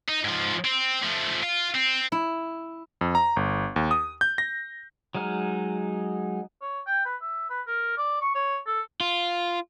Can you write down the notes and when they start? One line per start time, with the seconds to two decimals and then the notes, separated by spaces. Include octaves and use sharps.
0.08 D#4
0.24 G#2 F3
0.65 C4
1.03 F3 A3
1.43 F4
1.74 C4
2.12 E4
3.01 F2
3.15 A#5
3.36 G1
3.76 D#2
3.91 D#6
4.21 G6
4.38 A#6
5.15 F#3 G#3 D#4 F6
6.62 C#5
6.87 G5
7.05 B4
7.21 E5
7.50 B4
7.67 A#4
7.98 D5
8.22 C#6
8.35 C#5
8.66 A4
9.01 F4